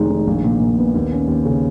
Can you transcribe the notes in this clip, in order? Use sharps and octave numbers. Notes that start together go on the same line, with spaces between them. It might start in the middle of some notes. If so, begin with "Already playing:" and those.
Already playing: F1 D#3 G#3 D#4
D#3
A#1
A#2
A#2
B3
D#2
C#4
D#2
C#3